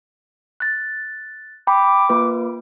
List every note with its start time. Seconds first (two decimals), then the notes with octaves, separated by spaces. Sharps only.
0.60 F#6 A6
1.67 G5 B5 D6
2.09 A#3 F4 B4